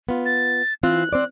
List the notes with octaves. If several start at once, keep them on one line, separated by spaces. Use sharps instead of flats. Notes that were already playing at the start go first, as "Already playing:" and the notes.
B3 F4
A6
E3 C4 F4 F#6
C4 C5 D5